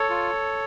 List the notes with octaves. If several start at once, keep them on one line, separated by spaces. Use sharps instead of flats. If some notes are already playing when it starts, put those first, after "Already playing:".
Already playing: A4 C#5
F4